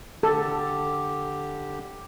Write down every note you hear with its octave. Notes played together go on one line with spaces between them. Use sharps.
D3 G4 A4